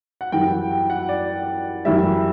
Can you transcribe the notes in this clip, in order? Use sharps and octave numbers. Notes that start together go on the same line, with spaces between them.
F#5
F#2 E3 G3 G5
F#5
G5
F#5
D5
F#2 E3 G3 E5